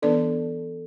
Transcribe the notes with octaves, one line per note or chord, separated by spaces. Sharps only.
E3 B3 D4 A4 B4 D5